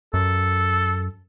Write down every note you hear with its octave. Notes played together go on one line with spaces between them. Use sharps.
F#2 A4